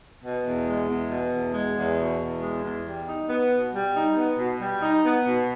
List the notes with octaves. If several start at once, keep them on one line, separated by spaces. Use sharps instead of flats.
B2
E2
G#3
E2
B2
E2
G#3
E2
B2
E2
G#3
E2
G3
D#4
B3
B2
G3
D#4
B3
B2
G3
D#4
B3
B2